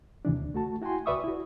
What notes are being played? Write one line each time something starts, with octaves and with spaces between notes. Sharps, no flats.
D#2 C3 E3 D4
D2
A3 F#4 A5
E4 F#4 G5 G#5 C6
C#2 B4 D5 E5 C#6 D#6
E4 F#4